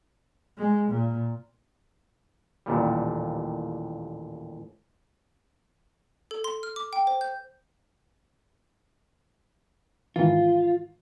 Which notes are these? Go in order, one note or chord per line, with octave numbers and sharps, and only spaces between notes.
G#3
A#2
A1 D#2 A#2 G3
A4
C6
F6
D6
G5
C5
G6
G#2 D#3 E3 F4